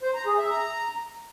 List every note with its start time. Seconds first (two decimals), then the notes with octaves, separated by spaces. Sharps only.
0.02 C5
0.14 A#5
0.26 G#4
0.38 E5
0.50 A#5